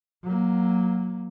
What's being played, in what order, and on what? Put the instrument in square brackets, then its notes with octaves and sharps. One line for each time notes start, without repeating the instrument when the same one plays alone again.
[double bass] F#3 A#3